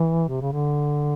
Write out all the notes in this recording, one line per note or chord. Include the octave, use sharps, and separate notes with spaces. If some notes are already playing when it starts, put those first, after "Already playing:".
Already playing: E3
C3
C#3
D3